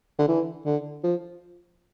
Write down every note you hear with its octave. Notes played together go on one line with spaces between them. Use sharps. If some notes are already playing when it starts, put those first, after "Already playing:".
D3
E3
D3
F3